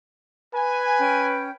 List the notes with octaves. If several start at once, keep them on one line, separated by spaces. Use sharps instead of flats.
B4 G#5
C#4 G5 G6